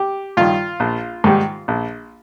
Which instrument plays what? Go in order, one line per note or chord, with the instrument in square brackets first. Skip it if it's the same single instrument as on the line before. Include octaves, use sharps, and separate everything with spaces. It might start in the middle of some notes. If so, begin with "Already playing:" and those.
Already playing: [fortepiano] G4
G2 D#3 F4
A#1
G#2 D#3 G3
A#1